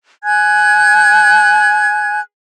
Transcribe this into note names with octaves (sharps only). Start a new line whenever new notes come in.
G#5 F#6 G#6